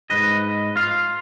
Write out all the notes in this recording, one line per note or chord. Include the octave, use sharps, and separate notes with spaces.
G#2 B4 D#5
F4 F5